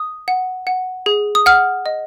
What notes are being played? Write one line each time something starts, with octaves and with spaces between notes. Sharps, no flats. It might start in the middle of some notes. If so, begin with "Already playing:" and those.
Already playing: D#6
F#5
F#5
G#4
D#6
F#5 F6
D#5